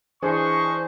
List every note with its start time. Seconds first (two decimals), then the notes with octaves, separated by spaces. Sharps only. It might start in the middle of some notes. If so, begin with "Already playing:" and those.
0.22 E3 D4 G#4 C5 D#5 C6 C#6